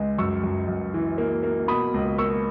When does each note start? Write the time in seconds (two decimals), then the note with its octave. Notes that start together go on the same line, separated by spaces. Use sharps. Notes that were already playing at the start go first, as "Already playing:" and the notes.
Already playing: C#2 G#3
0.18 F#2 C#6 E6
0.44 F#2
0.68 F#2
0.94 E3
1.18 A#3
1.43 A#3
1.68 B2 B5 D#6
1.94 C#2
2.18 A#3 C#6 E6